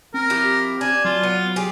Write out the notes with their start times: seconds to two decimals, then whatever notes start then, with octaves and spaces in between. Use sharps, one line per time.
0.14 C4 A#4
0.30 F3 E4 G4
0.81 D4 G#5
1.05 F#3 F4
1.23 B3
1.56 G4 G#4